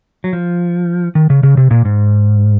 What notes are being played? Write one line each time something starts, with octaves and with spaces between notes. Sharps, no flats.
F#3
F3
D#3
C#3
C#3
C3
A#2
G#2